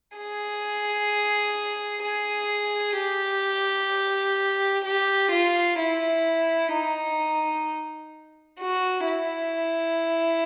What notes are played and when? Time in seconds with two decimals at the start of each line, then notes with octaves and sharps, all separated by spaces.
0.17 G#4
2.04 G#4
2.97 G4
4.85 G4
5.32 F4
5.79 E4
6.73 D#4
8.60 F#4
9.07 E4